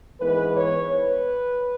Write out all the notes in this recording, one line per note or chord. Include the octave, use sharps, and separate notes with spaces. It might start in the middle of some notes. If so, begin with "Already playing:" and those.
G#2 E3 B3 B4
C#5
B4